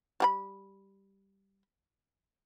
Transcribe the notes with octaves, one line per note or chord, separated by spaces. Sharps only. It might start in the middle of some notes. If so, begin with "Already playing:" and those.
G3 G4 B5